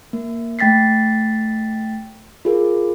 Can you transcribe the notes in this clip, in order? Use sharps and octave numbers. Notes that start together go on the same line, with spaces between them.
A#3
A3 G5 A6 B6 C7
F4 G#4 A#4